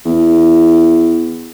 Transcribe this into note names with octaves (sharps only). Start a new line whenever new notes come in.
E2